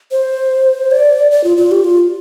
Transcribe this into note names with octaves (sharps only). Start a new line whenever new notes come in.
C5
D5
D5
F4
F4
G4
F4